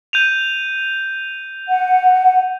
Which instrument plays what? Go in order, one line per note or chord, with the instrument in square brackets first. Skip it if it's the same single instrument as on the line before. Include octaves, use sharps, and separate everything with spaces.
[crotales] G6 D#7 F7
[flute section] F#5